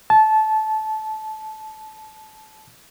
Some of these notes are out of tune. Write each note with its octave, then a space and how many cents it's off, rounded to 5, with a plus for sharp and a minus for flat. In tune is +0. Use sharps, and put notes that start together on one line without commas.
A5 -20